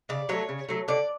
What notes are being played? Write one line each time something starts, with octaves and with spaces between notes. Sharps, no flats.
C#3 D5
F#3 A3 C#5
C#3
F#3 A3
D3 D5